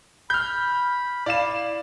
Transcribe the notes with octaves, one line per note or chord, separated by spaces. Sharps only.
B5 F6 G6
E4 D5 F5 E7